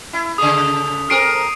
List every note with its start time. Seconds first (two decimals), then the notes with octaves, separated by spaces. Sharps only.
0.13 E4
0.38 C#3 A3 G#4 D#6
1.10 C4 A4 A#4 C7 D7 D#7